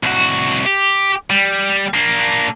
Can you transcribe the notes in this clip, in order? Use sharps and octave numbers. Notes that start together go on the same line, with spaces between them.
C2 F#4
G4
G3
A#3 D4